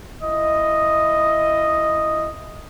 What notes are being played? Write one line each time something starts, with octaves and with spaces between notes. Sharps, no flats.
E4 D#5